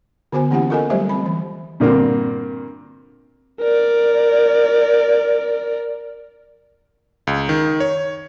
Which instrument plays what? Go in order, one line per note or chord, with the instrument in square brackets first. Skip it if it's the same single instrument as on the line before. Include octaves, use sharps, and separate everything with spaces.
[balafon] D3 B3 F#4 C5 G#5
E3 A#3 C#4 E4 G4 F#5
F4 A4 A#4 D#5 G#5
F#3 G3 A3 G4 C5 E5
C4 B5
E3
[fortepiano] G2 A#2 D3 A#3 C4
[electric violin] A#4 D5
[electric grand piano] C#2
D#3
C#5